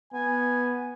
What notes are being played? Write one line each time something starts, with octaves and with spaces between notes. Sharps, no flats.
B3 G#5